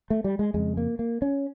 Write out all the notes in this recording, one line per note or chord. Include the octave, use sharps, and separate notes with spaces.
A3
G3
G#3
F2 C#3 G#3
A#3
A#3
C#4